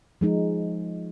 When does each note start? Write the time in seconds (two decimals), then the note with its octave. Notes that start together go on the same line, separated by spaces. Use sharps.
0.21 F3 G#3 D#4